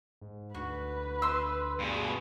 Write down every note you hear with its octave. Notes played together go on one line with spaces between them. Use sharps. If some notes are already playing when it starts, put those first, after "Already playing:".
G#2
D2 F#4 B4
C6 E6
G2 B2 G#4